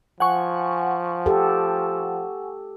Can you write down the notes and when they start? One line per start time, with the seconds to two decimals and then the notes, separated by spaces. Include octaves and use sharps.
0.20 F3 F#5 G#5 C#6
1.26 G4 A4